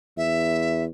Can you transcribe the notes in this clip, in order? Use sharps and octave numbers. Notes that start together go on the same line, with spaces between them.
E2 E5